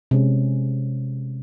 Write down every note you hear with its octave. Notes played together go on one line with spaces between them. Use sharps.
C3 G#3 C#4